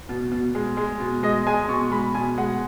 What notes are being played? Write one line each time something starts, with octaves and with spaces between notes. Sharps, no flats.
B2
B2
G#3
G#3
B2
G#3 D#5
G#3 G#5
B2 C#6
G#3 B5
B2 G#5
G#3 F#5